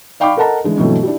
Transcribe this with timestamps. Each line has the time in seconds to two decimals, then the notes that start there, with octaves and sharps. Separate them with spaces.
0.20 D5 F5 G5 B5 C#6 D6
0.37 A4 A#4 D#5 F#5 A5 A#5
0.64 D3 E3 G#3
0.77 G2 B2 E3 F#3 A3 C4
1.03 D4 E4 G4